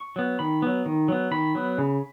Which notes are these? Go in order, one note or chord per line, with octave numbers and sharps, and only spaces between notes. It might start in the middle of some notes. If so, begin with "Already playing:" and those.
Already playing: C#6
F#3 B3
D#3 B5
F#3 B3
D#3
F#3 B3
D#3 B5
F#3 B3
C#3